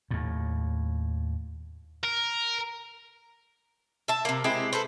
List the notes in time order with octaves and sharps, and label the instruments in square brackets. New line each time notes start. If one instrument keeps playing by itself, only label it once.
[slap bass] D#2 A2
[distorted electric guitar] A#4
[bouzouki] E5 A5
C3 A#3
G#3 C4 E4 G4
A4 B4 C5